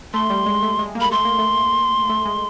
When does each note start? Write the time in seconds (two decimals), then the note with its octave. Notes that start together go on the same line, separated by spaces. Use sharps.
0.13 A3 C6
0.30 G3
0.46 G#3
0.63 A3
0.79 G#3
0.95 A#3
1.01 B5
1.11 A3 C6
1.25 A#3
1.38 A3
2.09 A3
2.25 G#3